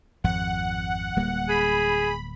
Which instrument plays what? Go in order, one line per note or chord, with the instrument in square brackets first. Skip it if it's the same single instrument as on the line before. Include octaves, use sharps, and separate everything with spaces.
[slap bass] G#1 F2 F3 [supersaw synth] F#5
[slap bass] D1 G3 A#3
[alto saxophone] G#4 [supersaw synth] B5